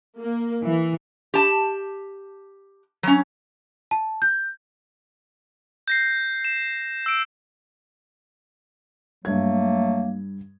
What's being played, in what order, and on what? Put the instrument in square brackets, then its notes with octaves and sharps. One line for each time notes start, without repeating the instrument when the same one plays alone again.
[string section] A#3
E3
[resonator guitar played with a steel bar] G4 A5
F#3 C#4
[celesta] A5
G6
[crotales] G6 A#6 C7
E7
E6 D7
[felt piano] G2 G#6 [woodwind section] F#3 A3 A#3